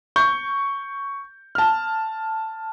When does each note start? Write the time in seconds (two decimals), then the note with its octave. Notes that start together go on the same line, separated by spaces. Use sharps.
0.16 C#6 G6
1.55 A5 F6